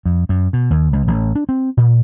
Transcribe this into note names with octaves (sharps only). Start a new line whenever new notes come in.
F2
F#2
B2
D#2
C#2
A1
D4
C4
A#2